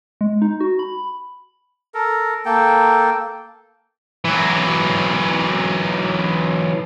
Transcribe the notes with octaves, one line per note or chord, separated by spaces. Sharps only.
G#3
D#4
F#4
B5
A4 A#4
A#3 A4 G5
E3 F#3